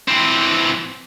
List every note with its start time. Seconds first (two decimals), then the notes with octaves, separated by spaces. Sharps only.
0.08 E3 C4